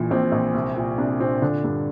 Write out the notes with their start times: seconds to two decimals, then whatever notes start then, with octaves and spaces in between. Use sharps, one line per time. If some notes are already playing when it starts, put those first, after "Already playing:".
Already playing: A#1 A#2 E3
0.11 A#1 C4
0.32 A#1
0.54 C2
0.76 A#2
0.98 C2 D4
1.20 A#2 C4
1.42 D3 D4
1.64 G2